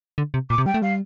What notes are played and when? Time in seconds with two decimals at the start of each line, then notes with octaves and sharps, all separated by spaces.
0.18 D3
0.34 C3
0.50 A#2 D6
0.58 C3
0.66 G3 G5
0.74 A3
0.82 G3 F5